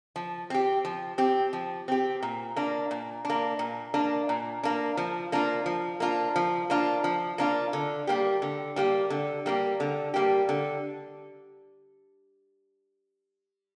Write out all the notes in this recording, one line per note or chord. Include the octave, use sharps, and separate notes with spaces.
F3
C4 G4
F3
C4 G4
F3
C4 G4
A#2
A#3 D4
A#2
A#3 D4
A#2
A#3 D4
A#2
A#3 D4
F3
A#3 D4 F4
F3
A#3 D4 F4
F3
A#3 D4 F4
F3
A#3 D4 F4
D3
G3 A#3 G4
D3
G3 A#3 G4
D3
G3 A#3 G4
D3
G3 A#3 G4
D3